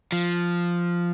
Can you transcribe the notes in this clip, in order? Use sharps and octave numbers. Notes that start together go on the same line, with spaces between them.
F3